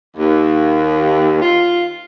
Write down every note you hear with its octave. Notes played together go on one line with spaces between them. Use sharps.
D#2
F4